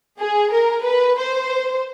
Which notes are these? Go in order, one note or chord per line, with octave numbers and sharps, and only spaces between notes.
G#4
A#4
B4
C5